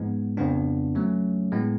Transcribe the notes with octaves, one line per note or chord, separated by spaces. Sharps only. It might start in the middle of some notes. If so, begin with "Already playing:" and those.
Already playing: G#2 F3 G#3 B3
F2 C#3 F3 B3 D4
F#3 A3 C#4
A2 G#3 B3